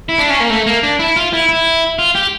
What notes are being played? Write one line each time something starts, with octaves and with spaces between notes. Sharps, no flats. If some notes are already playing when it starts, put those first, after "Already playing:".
E4
D4
C#4
A#3
A3
A#3
D4
E4
F4
E4
E4
F4
G4